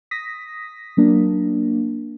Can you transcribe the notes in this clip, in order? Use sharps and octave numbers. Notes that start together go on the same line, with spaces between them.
D#6 A#6 B6
F#3 A#3 D4